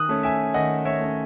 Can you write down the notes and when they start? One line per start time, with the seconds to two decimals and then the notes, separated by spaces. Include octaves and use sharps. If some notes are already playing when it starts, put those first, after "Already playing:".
Already playing: D#3 D#6 F#6
0.09 A3 C#4
0.23 E5 G#5
0.54 D#3 D#5 F#5
0.85 C#5 E5
1.00 A3 C#4